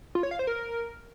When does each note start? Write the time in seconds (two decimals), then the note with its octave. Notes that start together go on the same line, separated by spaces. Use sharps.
0.15 F4
0.23 C#5
0.31 F5
0.39 C5
0.47 A#4